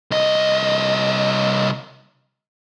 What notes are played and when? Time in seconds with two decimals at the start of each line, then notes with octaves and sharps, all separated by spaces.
0.11 C2 D#5